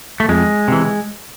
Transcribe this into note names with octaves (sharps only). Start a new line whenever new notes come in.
A3
F2 G#3
C3 E3